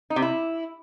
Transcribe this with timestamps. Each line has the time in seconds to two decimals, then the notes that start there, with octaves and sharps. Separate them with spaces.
0.10 D#4
0.16 C3
0.22 E4